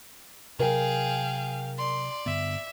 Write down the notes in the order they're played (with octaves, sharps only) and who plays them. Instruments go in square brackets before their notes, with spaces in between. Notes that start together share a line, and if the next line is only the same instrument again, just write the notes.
[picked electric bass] C3 F#3 [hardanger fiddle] G#4 [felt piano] A#4 [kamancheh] F5 G5
[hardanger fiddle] D5 [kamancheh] C6
[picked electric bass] G2 D3 B3 [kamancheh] E5